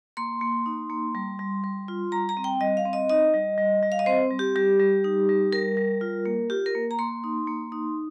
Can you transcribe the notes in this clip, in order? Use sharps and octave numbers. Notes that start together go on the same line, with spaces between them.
A#3 C6
A#3
D#4
A#3
G3
G3
G3
F4
G3 A#5
A#5
C4
G5
G3 D#5
F5
C4
D#5
D#4 D#5
G3
G3
G3
F5
D#5
C4 C5
G3
G4
G3 G4
G3
D#4
G3
G3 A#4
G3
F4
A#3
F4 G4
A#4
A#3
A#5
A#3 C6
D#4
A#3
D#4